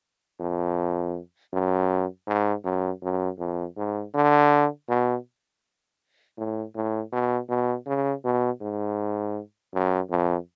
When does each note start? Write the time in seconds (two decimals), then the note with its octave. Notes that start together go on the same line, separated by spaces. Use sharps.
0.40 F2
1.53 F#2
2.27 G#2
2.65 F#2
3.03 F#2
3.39 F2
3.77 G#2
4.14 D3
4.89 B2
6.38 A2
6.75 A2
7.12 B2
7.49 B2
7.87 C#3
8.24 B2
8.61 G#2
9.74 F#2
10.10 F2